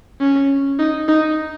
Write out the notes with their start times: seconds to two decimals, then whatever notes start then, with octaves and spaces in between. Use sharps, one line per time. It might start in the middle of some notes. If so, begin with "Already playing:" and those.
0.20 C#4
0.79 D#4
1.08 D#4